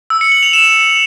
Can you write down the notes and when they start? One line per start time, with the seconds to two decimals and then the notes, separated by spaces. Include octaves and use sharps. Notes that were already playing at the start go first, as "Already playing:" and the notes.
0.10 E6
0.21 C#7
0.32 F#7
0.43 F7
0.53 E7